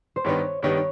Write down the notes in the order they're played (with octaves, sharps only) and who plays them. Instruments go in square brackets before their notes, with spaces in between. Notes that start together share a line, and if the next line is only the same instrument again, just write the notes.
[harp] C5
[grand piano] G2 D#3 G3 B3 [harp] C#5
[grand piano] G2 D#3 G3 B3 [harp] C#5